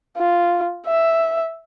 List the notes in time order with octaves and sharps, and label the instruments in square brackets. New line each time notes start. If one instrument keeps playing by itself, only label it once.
[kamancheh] F4
E5